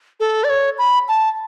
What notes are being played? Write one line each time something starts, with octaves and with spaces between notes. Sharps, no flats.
A4
D5
C#5
B5
A5